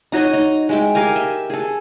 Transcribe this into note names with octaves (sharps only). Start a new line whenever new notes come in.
D#4 F#4 C#5 D#5
D#4
G#3 E5 G5
G4 A#4 F5 G#5
E5
G#4 A4